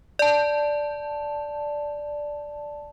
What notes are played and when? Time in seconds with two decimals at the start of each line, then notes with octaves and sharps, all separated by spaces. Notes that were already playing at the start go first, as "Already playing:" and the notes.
0.19 D5 A5